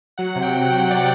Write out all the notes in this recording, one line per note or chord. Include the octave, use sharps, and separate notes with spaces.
F#3 F#5
C3
G5
C3
F#5
F#3
F#3 D5